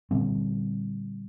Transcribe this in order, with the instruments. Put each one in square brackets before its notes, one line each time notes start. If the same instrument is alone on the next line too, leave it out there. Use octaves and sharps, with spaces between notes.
[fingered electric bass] A#2 D3 G3 C4